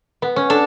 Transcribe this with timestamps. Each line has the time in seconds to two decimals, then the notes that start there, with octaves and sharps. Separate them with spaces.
0.22 B3
0.36 C#4
0.50 D4 A4